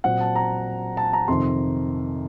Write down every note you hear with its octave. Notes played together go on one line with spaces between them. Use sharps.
A#2 F#3 C4 F#5
A5
A#5
A5
A#5
F2 C3 D#3 C6